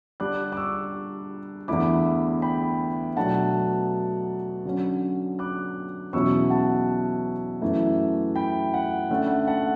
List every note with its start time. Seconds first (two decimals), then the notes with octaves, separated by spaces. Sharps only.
0.20 D3 G3 D4 D6 F#6
0.52 D6
0.57 C#6 E6
1.68 E2 D3 A3 E4 B5 D6
2.42 G5 B5
3.16 B2 F#3 A3 D4 F#5 A5
4.65 D3 F#3 C#4
5.39 D6 F#6
6.13 E2 B2 F#3 C#4 E4 C#6 E6
6.50 F#5 A5
7.61 F#2 E3 A3
8.35 G5 B5
8.74 F#5
9.10 D3 A3 C#4 F#5
9.47 F#5 A5